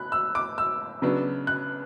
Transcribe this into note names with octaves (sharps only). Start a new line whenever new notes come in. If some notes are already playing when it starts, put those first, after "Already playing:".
Already playing: B5 F#6
E6
D6
E6
C#3 F#3 B3 D4
F#6